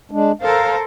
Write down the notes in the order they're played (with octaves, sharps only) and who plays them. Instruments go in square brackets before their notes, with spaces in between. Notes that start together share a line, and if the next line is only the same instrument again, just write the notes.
[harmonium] G#3 D4
[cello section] A4 A#4 C5 [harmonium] F5